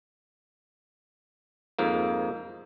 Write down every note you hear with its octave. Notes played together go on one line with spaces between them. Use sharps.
F2 G#2 A#3